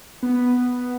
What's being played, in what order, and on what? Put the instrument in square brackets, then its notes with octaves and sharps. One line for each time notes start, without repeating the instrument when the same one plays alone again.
[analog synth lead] B3